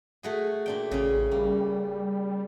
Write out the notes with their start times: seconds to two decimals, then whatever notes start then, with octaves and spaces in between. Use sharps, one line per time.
0.23 A3 F#4 G#4
0.66 A#2 D4 G5
0.91 A1 C#3 A3 C#4
1.31 G3 A#3